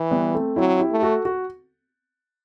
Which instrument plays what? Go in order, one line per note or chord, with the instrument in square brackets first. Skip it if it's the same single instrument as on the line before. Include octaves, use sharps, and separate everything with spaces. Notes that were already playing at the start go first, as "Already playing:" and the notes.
Already playing: [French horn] E3
[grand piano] G3 B3
A3 C4
[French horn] F#3 [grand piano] C4 E4
[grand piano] E4 G4
[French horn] A3
[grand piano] F#4 A4
F#4